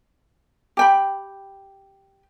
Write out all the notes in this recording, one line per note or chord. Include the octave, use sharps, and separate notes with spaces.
G4 G5 B5